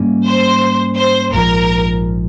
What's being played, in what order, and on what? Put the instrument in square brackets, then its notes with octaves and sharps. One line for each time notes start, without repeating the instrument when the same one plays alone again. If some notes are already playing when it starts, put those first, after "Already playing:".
Already playing: [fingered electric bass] G#2 G3 A#3 C#4
[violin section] C5
C5
[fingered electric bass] A#1 G#2 F3 [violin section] A#4